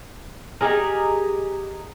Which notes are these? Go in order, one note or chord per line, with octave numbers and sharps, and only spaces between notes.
D#4 G4 G#4 A#4